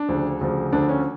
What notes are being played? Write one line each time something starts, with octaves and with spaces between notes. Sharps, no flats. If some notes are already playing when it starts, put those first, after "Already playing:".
Already playing: D4
D2 C#3 F3
D2 C#3 F3
D2 D3 F3 D4
C#4